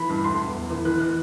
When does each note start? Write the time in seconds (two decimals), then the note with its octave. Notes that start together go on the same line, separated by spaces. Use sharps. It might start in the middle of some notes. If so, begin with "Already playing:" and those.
Already playing: E3 B5
0.09 G2
0.24 D2 C6
0.40 E1
0.55 E2
0.70 E3
0.85 E3 F#6
1.00 F#6